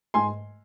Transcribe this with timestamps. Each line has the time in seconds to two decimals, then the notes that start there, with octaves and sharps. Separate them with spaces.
0.14 G#2 G#5 C6